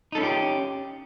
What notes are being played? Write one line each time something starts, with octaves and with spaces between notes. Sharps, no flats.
C#4 D#4 E4 G4 A4